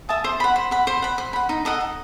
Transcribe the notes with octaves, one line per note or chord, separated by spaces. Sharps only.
E5 A5 D#6
C5
F#5 B5
C5
F#5 B5
C5
F#5 B5
C5
F#5 B5
D#4
A4 D#5 F#5
D#4